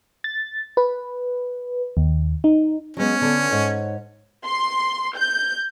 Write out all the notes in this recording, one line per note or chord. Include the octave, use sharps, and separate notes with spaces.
A6
B4
D#2
D#4
F#3 G#3 B3 C#4
D3 B3
G#2 C#5 F#5
C6
G6